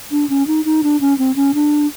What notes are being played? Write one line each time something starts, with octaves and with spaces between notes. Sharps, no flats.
D4
C#4
D#4
D#4
D4
C#4
C4
C#4
D4